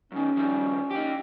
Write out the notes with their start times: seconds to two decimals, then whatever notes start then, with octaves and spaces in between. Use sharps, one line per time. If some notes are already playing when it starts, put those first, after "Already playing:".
0.12 F#2 D#3 C#4
0.37 D#3 F3 G3
0.91 D#4 G4